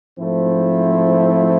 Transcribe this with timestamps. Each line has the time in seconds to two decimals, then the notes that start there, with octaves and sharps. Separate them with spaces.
0.18 G#2 F3 A3 C4 E4